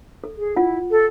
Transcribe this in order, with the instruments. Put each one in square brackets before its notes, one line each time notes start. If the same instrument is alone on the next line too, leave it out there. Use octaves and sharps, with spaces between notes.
[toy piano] A4
[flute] G#4
[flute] E4 [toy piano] F4 F#5
[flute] A4